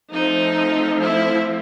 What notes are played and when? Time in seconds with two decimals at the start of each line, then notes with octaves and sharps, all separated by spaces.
0.12 F3 A3 C4 D#4
1.00 E4